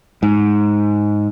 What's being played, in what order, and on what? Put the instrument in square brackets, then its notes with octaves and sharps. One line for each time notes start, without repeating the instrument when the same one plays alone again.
[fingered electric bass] G#2